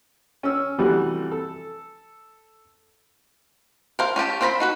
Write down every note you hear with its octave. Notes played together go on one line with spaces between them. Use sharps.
C#4 E6
C3 E3 G3 A3 F#4
A4
A#4 C5 F5
C#4 F4 G4 A5
C4 F4 C5 A#5 B5
D#4 F#4 B4